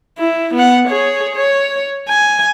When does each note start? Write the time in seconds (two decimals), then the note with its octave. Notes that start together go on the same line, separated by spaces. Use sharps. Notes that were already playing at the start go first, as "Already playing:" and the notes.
0.19 E4
0.54 B3 F#5
0.88 G#4 C#5
1.36 C#5
2.09 G#5